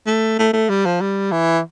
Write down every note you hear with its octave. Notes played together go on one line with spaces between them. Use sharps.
A3
A3
A3
G3
F3
G3
E3